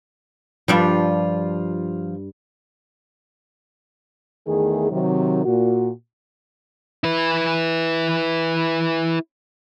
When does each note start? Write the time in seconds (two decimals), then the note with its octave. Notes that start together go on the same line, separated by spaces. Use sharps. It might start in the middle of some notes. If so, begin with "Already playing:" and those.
0.68 G2 F3 G3 D4 F4
4.47 E2 D#3 A3 G#4
4.91 C3 D#3 F#3
5.45 A#2 F#4
7.04 E4 B4